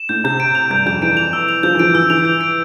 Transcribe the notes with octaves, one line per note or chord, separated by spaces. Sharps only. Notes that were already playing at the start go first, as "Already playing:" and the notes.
Already playing: E7
A2 G6
C3 G6
D7
F7
G2 G6
F2 G6
E3 D7
F7
E6
F7
F3 G6
E3
F3 D7
E3 E6
E3 F7
G6
D7